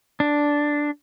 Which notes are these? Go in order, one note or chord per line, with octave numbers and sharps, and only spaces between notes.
D4